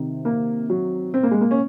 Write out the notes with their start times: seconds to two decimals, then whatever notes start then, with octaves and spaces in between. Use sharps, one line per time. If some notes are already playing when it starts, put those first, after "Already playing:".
Already playing: C3 D#3
0.25 A#3
0.70 F#3
1.14 C4
1.23 A#3
1.31 G#3
1.41 A#3
1.51 C#4